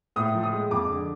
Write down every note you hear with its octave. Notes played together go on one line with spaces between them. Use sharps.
A2 D#6
F3
D#6
G#3
F2 D6
D3